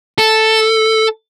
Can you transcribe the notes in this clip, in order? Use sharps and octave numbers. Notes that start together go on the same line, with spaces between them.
A4